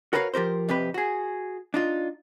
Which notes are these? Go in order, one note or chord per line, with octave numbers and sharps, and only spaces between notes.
F#4 A#4 B4 C#5 D#5 F5
F3 G4 A#4 C5
F2 C3 G4 B4
F#4 G#4
D4 D#4 F4